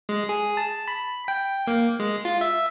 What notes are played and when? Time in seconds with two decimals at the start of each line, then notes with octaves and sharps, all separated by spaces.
0.09 G#3
0.29 G#4
0.57 A5
0.88 B5
1.28 G5
1.67 A#3
2.00 G#3
2.25 F4
2.41 E5